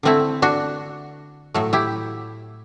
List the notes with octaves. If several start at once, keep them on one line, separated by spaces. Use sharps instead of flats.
D3 A3 C4 E4
D4 F#4
A2 F#3 A3
E4 G4